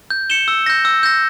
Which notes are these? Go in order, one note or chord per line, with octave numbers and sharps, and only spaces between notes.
G6
C#7 E7 G7
E6
G6 A#6
E6
G6 A#6